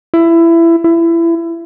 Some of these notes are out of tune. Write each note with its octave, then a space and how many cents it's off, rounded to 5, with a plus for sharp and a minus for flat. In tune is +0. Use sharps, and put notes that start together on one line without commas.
E4 +20
E4 +25